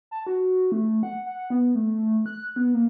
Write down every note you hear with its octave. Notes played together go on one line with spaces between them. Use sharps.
A5
F#4
A3
F#5
F#5
B3
A3
F#6
B3
A#3